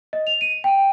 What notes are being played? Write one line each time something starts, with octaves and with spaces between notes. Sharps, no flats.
D#5
F7
D#7
G5